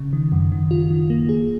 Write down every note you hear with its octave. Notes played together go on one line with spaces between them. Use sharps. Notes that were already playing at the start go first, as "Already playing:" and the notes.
Already playing: C#3
D#3
F#2
D#3
F4
D#3
A#3
G#4